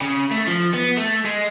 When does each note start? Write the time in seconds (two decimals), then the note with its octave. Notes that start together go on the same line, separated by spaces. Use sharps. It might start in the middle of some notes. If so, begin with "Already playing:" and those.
0.02 C#3
0.31 A3
0.48 F3
0.74 B3
0.97 A3
1.25 G#3